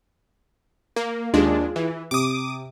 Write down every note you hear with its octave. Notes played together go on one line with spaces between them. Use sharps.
A#3
D#2 G#3 D4 F4 G#4
E3
C3 D6 D#6